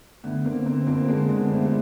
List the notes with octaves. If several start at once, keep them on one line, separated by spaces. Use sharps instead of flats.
D3 A3 B3
D3 A#3 C4
D3 A#3 C4
F2 A#3 C4
D3 G#3 A#3
D3
B3
C4
D3 A3 B3
G3 A3